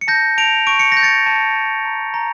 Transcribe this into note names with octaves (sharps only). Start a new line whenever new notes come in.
C#7
A5 G6 A#6
A5 D7 F7
C#6 D7
C#7
A#6
G6
A6 C#7
A5
A5
A#5
A#5